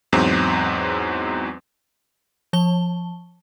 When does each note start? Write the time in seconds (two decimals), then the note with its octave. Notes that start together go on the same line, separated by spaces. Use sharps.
0.13 E2 G#2 F#3 C4
2.53 F3 A5 G7